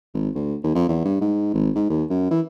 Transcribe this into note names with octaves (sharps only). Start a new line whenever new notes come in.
G#1
D2
D#2
F2
E2
G2
G#2
G#1
G#2
D#2
F#2
E3